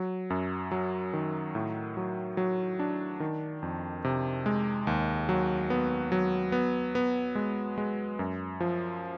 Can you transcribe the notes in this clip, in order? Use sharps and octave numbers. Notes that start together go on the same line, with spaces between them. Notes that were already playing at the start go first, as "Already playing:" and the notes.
Already playing: F#3
F#2
F#3
D#3
A2
F#3
F#3
D4
D#3
F2
C3
G#3
D#2
F#3
B3
F#3
B3
B3
G#3
G#3
F#2
F3